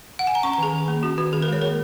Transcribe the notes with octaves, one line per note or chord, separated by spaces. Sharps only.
F#5
G#5
A#5
C#4 C#6
A#5
D#3 G#4
D#3
A#3
C#4 F#4
D#3 F#4
D#3 G#4
A#4
G#3 C#5
A#3 A#4